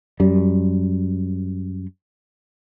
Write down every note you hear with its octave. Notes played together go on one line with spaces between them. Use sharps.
F#2 G3